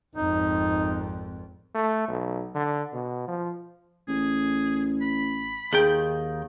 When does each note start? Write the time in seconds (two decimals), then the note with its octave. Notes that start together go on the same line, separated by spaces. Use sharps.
0.16 G#1 F2 D#4
1.74 A3
2.08 B1
2.55 D3
2.93 B2
3.27 F3
4.08 A1 G#4
5.01 B5
5.73 D#2 D#3 G#4 G5